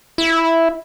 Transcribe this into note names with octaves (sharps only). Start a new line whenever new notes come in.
E4